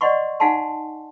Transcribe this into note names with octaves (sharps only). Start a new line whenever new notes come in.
D5 D#5 F#5 C6 C#6
D#4 F5 F#5 G#5 A5 C6